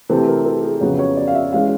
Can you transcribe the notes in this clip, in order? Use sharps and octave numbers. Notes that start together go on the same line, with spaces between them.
C3 E3 A3 C4 A4
A#4
A4
G#4
F2 C#3 F#3 B3 C#5
C#5
D5
F5
E5
E3 G#3 C#4 F5